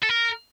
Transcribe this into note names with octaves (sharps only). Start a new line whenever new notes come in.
A4
A#4